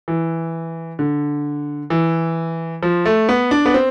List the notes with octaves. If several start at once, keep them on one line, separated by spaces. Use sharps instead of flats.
E3
D3
E3
F3
A3
B3
D4
B3
C4